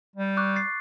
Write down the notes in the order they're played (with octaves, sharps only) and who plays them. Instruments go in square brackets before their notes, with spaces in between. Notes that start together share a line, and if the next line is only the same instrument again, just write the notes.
[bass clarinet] G3
[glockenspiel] C#6 D6 F#6
A6 C7